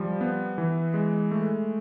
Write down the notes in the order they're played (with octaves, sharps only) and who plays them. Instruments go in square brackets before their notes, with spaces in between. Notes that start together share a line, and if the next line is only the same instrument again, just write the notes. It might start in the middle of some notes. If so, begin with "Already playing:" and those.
Already playing: [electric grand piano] F3 G3
B3
E3
G#3
A3